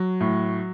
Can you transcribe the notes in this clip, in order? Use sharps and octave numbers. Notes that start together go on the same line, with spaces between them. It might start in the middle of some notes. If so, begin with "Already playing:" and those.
Already playing: F#3
A2